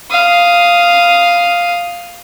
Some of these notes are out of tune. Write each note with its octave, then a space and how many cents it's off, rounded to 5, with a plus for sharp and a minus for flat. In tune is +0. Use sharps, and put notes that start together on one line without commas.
F5 +0 D#6 +0